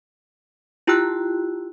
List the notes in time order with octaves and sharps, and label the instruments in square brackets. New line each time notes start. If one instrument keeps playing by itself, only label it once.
[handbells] E4 F4 G4 G5 E6 F#6